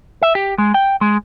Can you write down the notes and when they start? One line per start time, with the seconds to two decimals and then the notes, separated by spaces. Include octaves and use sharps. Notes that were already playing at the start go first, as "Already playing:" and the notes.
0.23 E5
0.35 G4
0.58 G#3
0.74 G5
1.01 G#3